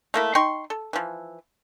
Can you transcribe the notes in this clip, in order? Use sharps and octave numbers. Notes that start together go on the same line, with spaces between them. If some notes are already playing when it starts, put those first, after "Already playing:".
A3 A#3 E4
D#4 G5 C6 C#6
A4
E3 F3